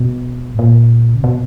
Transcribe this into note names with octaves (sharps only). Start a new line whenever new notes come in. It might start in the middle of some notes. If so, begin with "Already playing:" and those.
Already playing: B2
G#2
A#2
C#3
B2